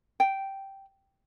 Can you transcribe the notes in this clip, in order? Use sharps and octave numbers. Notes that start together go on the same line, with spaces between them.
G5